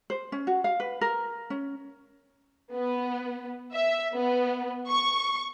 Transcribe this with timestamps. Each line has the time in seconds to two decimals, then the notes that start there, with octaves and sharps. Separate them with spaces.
0.10 C5
0.32 C#4
0.47 F#4
0.64 F5
0.80 B4
1.01 A#4
1.50 C#4
2.73 B3
3.73 E5
4.15 B3
4.89 C#6